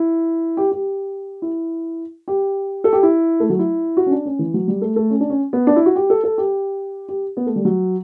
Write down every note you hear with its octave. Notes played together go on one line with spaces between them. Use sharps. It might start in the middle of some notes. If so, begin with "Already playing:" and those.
Already playing: E4
G4
G4
E4
G4
A4
G4
E4
A3
F#3
E4
F#4
C#4
D4
C#4
E3
F#3
G3
A3
A3
C#4
D4
C#4
B3
D4
E4
F#4
G4
A4
A4
G4
G4
B3
A3
G3
F#3